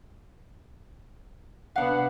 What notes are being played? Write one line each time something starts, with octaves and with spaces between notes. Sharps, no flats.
C3 B3 D4 F5 F#5